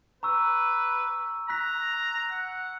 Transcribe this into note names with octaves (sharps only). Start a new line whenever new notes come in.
B4 A#5 C#6 E6
A#5 F#6 B6
F#5